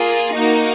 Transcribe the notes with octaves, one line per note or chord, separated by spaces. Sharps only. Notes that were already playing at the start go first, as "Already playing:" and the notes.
Already playing: A#3 F4 G#4
A#3 D#4 F#4